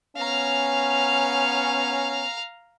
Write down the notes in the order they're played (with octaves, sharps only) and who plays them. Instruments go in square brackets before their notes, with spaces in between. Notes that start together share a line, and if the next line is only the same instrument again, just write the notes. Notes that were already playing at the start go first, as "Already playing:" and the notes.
[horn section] B3 C#4 [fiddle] F5 A#5